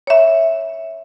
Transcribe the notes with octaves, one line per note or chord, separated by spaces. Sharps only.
C#5 E5